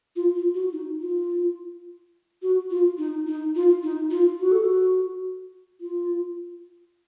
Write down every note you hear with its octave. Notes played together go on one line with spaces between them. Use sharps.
F4
F4
F#4
D#4
F4
F#4
F4
D#4
D#4
F4
D#4
F4
F#4
A4
F#4
F4